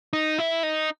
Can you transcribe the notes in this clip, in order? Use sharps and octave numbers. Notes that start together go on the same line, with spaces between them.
D#4
E4
D#4